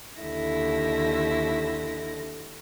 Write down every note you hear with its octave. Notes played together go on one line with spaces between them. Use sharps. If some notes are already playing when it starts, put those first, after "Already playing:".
D#2 D3 E4 A#6